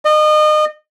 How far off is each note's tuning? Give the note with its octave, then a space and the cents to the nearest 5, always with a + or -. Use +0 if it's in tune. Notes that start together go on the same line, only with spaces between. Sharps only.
D#5 -30